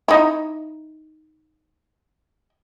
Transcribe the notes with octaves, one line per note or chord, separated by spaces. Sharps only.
D#4 E4